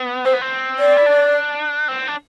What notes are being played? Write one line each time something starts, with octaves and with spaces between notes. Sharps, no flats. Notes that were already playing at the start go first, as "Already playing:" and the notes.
Already playing: B3
C4 C5
B3
C4
D5
E4
D4
C4
D4